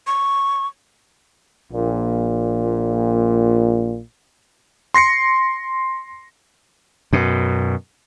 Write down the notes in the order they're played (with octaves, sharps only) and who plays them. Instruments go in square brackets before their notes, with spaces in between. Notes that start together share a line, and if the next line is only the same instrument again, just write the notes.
[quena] C#6
[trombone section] A#1 A#2
[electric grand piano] C6 A#6 C7 C#7
[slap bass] F#2 B2